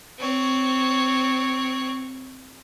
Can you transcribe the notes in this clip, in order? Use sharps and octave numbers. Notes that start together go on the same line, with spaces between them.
C4 C#5